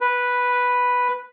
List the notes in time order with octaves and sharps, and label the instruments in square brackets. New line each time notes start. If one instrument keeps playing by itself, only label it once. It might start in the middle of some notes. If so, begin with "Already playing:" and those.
[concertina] B4